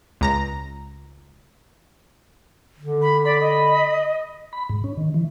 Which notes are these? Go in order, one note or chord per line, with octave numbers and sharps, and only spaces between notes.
C#2 A#5 A#6
D3
B5
D5 B5
D#5
B5
G#2
C#4
D#3
E3